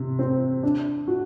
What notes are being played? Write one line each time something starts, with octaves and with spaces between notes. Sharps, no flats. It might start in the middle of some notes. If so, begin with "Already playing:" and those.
Already playing: C3
C4
D4
F#4